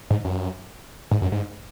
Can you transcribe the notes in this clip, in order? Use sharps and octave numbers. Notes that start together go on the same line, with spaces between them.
G#2
F#2
G#2
F#2
G#2